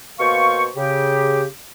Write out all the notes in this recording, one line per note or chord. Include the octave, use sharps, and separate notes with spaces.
B2 A#3 C5 F5 C#6
C#3 G4